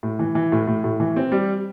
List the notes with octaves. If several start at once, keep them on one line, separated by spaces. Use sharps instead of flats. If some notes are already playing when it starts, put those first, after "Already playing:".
A2
E3
E3
A2
A2
A2
E3
C4
G3